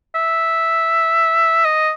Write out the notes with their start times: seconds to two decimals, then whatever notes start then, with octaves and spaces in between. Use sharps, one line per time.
0.15 E5
1.65 D#5